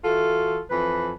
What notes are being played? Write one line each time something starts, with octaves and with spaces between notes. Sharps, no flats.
E3 F4 F#4 A4
F2 E3 B4